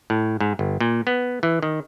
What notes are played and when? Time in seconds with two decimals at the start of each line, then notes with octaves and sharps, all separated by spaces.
0.10 A2
0.40 G#2
0.59 G1
0.80 A#2
1.07 B3
1.43 E3
1.63 D#3